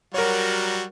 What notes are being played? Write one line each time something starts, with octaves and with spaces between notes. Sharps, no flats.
F#3 G3 F#4 A#4 C#5